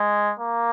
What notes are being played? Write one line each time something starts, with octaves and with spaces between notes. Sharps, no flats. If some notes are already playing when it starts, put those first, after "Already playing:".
Already playing: G#3
A#3